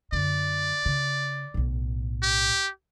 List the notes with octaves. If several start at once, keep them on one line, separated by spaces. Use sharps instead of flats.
F#2 D3 D5
C#3
B1 A2
G4